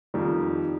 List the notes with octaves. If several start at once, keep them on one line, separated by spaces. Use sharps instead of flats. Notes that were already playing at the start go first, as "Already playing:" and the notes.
F2 D#3 G3